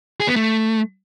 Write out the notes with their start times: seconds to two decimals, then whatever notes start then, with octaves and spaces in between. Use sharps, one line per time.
0.20 G#4
0.28 B3
0.36 A3